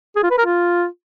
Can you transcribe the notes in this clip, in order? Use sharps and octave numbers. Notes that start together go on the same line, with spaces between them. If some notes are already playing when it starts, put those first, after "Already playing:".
G#4
F4
B4
A#4
F4